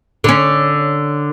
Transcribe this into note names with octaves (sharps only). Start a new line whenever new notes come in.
D3 C#4